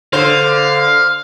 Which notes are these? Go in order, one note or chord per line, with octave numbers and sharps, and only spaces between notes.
D3 C5 F5